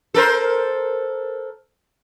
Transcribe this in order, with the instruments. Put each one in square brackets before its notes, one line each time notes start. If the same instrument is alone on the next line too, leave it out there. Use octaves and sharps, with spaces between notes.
[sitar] A4 A#4 C5